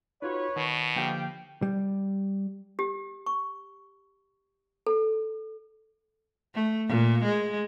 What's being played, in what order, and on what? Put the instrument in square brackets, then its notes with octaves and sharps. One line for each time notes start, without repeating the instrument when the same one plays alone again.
[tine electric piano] D#4 F4 F#4 [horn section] B4 C#5
[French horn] B2 [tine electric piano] D#3
[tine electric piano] D3 F3 A#3 [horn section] G4 F5 G5
[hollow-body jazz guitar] G3
[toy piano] G4
C#6
A4
[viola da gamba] A3
A#2
G#3